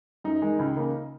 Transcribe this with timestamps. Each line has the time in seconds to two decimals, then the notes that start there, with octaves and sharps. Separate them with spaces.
0.24 F#2 D#4
0.42 D#3 G#3
0.59 C#2
0.76 C#3 A#3